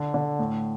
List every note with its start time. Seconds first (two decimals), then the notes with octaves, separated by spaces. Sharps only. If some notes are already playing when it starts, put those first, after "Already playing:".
Already playing: D3
0.14 D3
0.39 A2